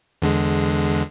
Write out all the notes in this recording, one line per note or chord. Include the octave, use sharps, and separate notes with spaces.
E2 D3 G#3